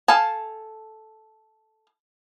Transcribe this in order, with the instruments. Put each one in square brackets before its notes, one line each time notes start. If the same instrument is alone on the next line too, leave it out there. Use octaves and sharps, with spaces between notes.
[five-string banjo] A4 F5 G#5 A5